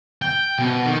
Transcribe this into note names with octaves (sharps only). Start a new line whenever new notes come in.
G5
B2
D#3